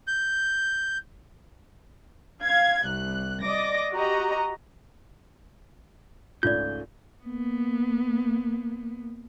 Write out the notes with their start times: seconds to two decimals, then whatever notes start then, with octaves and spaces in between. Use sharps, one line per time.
0.07 G6
2.41 F5 G#6
2.85 C2 F#6
3.42 D5 D#5 D6 A#6
3.93 F#4 G4 D#5 A#5
6.43 C#2 G#2 A3 F4 D5 G6
7.24 A#3 B3